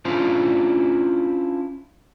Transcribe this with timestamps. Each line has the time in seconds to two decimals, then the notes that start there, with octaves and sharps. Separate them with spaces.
0.05 C#4 D4 E4 F4 C5